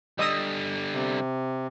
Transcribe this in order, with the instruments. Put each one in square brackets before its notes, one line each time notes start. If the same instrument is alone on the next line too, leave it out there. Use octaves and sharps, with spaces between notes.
[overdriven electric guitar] D3 G3 [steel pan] D#5 D#6 E6
[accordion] C3